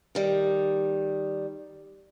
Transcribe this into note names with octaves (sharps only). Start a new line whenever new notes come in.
D#3 G3